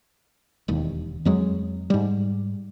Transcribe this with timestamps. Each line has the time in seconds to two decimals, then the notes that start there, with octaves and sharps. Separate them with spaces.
0.68 E1 D#2
1.25 F2 F#3 G#3
1.90 G#2 G3